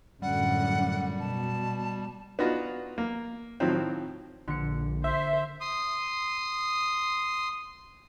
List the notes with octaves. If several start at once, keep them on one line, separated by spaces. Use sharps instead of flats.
F#2 A2 D3 G3 F#5
B2 A5
B3 D4 D#4 F4 F#4
A#3
A2 D#3 F3 F#3 C4
A#1 D3 C#7
C5 E5
C6 D#6